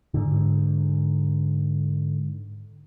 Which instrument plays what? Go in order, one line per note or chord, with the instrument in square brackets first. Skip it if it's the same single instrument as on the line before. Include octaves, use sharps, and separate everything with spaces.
[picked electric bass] G#2 D3